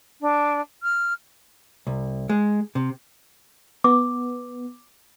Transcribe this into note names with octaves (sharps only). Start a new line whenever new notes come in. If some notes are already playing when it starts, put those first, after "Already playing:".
D4
F6
C2
G#3
C3
B3 D6